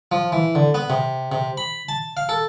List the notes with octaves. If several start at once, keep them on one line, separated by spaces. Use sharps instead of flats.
F3
E3
D3
B3
C3
C3
B5
A5
F5
A4